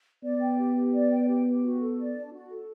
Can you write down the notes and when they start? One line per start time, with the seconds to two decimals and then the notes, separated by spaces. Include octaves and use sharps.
0.23 B3 D5
0.41 G5
0.58 G4
0.76 G4
0.93 D5
1.11 G5
1.28 G4
1.46 G4
1.62 F#4
1.80 A4
1.98 D5
2.15 D4
2.33 F#4
2.50 A4